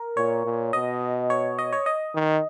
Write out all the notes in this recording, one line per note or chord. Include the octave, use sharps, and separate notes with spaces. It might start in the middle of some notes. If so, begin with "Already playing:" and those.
Already playing: A#4
A#2 C#5
A#2
B2 D#5
C#5
D#5
C#5
D#5
D#3